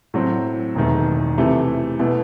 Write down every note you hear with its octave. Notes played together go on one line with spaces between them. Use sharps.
A2 F#3 C4
E1 E2 D#3 A3
C3 E3 A3
B2 A3 E4